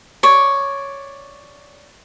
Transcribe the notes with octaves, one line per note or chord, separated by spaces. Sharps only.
C#5 D5